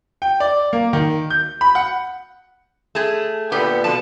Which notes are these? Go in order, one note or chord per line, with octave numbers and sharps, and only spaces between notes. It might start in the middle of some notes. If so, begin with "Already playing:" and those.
G5
D5
A#3
D#3
G6
B5
F#5
A3 G#4
A#2 D3 B3 G4
B2 D3 F3 A5